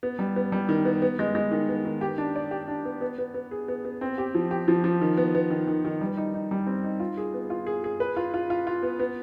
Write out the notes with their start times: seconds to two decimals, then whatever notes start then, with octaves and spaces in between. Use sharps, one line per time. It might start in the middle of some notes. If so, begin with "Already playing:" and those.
0.03 B3
0.19 G3
0.36 B3
0.52 G3
0.69 D#3
0.85 B3
1.02 B3
1.19 G#3
1.35 G#3
1.51 D#3
1.69 B3
1.85 D#3
2.01 G4
2.18 D4
2.36 D5
2.51 G4
2.68 D4
2.85 B3
3.01 B3
3.18 B3
3.34 B3
3.51 G#4
3.68 B3
3.85 B3
4.01 C4
4.18 G4
4.35 F3
4.51 G4
4.68 F3
4.84 F3
5.01 D#3
5.17 B3
5.35 B3
5.50 D#3
5.67 D#3
5.85 D#3
6.01 G3
6.17 D#4
6.34 D#4
6.51 G3
6.67 C4
6.84 D#4
7.00 F4
7.17 G#4
7.34 B3
7.50 F4
7.67 G#4
7.84 G#4
8.00 B4
8.16 F4
8.34 F4
8.50 F4
8.67 F4
8.83 B3
8.99 B3